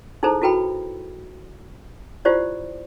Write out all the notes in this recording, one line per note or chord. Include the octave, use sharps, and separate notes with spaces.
D#4 E4 G#4 A4 C5 A#5
E4 F#4 A4 B4 G5 B5
E4 F4 G4 C5 D5